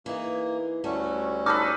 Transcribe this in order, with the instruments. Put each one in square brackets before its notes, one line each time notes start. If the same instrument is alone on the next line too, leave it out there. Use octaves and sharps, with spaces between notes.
[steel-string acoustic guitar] E3 D#4 G#4 [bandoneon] A#3
[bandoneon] D2 G3 C#4 [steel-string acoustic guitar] A3 F#4
[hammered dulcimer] D#4 A4 B4 [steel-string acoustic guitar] A5 [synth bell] D6 F6